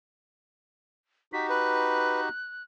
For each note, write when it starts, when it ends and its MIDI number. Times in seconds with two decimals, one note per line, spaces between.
1.33 2.29 63
1.33 2.29 66
1.33 2.29 67
1.33 1.49 95
1.49 2.21 71
1.49 2.63 90